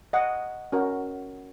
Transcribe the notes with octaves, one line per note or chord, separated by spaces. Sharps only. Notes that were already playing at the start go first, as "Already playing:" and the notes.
D#5 F#5
C#4 F#4 A#4